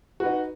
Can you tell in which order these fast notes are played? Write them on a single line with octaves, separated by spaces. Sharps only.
F#4 B4 D#4